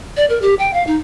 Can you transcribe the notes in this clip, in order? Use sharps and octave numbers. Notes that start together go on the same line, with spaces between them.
D5
A#4
G4
G5
F5
D#4